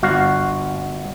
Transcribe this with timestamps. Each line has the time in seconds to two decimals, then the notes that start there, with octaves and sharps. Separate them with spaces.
0.03 G1 F#4 F5